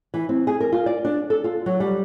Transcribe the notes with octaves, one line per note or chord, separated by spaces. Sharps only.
E3
C4
G#4
A#4
F4
D5
D4
A4
F4
F#3
G3